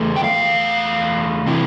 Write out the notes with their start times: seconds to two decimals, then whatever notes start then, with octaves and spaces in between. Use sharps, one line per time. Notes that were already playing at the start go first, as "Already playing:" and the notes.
Already playing: E2 E3 A3
0.16 G5
0.24 F5
1.46 C3 E3